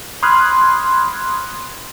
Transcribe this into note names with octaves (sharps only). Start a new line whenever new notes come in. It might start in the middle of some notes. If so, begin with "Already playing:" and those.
B5 C6 D#6 F6 F#6 G#6